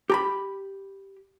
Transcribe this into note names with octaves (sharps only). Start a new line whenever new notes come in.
G4 A#5 B5